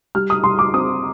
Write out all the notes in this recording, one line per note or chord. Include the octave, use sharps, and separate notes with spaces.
G3 F6
D#6
G3 C6
D6
C4 D#6